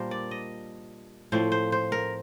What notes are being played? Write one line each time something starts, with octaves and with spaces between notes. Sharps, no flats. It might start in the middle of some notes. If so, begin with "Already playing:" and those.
Already playing: A#2 G3 D4 A#4 C5
D5
D#5
A2 F3 C4 C5
C5
C5
A#4